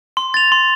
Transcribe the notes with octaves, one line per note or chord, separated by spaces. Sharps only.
C6
A6 F7
C6